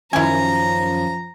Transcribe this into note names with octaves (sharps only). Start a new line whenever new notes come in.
F#2 D#3 F3 C#4 E4 G#5 A#5